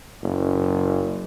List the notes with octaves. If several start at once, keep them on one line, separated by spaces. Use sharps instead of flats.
F#1